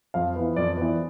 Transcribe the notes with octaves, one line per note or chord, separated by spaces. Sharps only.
F2 F5
E3 B3
F2 D5
E3 B3